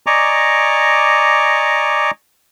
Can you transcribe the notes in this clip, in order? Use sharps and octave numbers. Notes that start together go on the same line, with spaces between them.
D5 D#5 G#5 A#5 C#6 D6